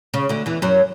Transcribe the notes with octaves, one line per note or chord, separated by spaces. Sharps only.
C#3
D2 D3
E2 E3
F#2 F#3